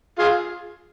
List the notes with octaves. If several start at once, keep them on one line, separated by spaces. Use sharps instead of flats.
F4 G#4